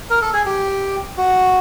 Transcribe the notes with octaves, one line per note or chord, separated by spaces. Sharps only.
A#4
A4
G#4
G4
F#4